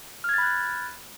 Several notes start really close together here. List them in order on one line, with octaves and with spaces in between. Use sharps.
F6 G#6 A6 B5 F#6